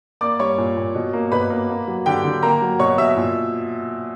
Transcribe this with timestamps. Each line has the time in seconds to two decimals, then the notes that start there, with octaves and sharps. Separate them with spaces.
0.21 A#3 D5 D6
0.39 G3 C#5 C#6
0.58 A#2
0.77 A#2
0.95 B2
1.13 A#3
1.32 B2 B4 B5
1.50 A#3
1.69 A#3
1.87 F#3
2.06 D3 G4 G5
2.24 D3
2.43 A#3 A#4 A#5
2.62 F#3
2.79 B2 C#5 C#6
2.98 B2 E5 E6
3.17 A#2